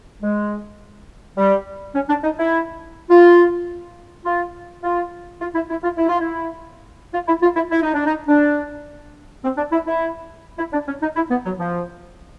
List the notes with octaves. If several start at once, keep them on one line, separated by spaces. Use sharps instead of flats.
G#3
G3
C#4
D4
D#4
E4
F4
F4
F4
F4
E4
E4
F4
E4
F4
E4
F4
E4
F4
E4
E4
D#4
D4
D#4
D4
C4
D4
E4
E4
E4
D4
C#4
D#4
E4
B3
F#3
F3